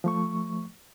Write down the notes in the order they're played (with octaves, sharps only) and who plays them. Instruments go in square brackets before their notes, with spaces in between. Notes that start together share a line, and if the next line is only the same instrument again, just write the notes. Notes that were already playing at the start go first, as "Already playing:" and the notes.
[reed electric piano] F3 A3 C#6